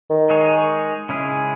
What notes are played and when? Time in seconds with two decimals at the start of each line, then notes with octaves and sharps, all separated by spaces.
0.10 D#3
0.30 G#3 D#4 G#4 C#5
1.09 C#3 G#3 C#4 E4 G#4